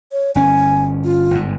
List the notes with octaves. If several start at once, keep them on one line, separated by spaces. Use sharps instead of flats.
C#5
G1 C#4 G#5
F4
G1 G#2